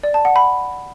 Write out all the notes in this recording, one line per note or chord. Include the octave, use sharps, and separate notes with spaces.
D5
A5
F#5
B5